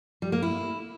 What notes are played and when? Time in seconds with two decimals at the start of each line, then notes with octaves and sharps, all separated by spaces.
0.22 G3
0.32 A#3
0.42 E4